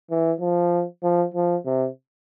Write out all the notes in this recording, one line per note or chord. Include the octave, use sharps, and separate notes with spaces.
E3
F3
F3
F3
C3